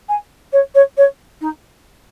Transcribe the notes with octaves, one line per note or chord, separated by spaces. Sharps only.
G#5
C#5
C#5
C#5
D#4